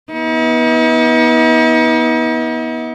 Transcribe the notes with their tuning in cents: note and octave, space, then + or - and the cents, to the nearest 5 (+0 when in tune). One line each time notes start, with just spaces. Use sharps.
B3 -25 D#4 +45